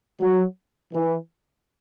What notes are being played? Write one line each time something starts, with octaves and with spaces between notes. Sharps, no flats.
F#3
E3